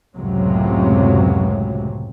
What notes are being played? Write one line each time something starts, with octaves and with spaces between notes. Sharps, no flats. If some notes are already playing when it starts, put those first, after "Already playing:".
C#2 F#2 A2 C3 F#3